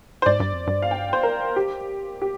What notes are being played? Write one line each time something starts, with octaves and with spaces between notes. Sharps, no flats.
C5
G#2 D5
G2
F2
G2
F5
G5
C5
A#4
G4
G4